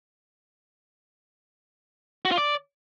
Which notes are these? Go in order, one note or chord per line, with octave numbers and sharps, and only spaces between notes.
F#4
F4
D5